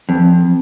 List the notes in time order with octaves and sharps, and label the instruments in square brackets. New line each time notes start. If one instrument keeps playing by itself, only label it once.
[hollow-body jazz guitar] F2